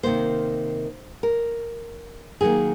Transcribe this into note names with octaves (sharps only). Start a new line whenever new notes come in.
C3 D#3 F#3 A#3 C5
A#4
D#3 F#3 A#3 G#4